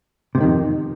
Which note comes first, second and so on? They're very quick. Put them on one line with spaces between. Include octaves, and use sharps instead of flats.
C3 G#2 D#3 F2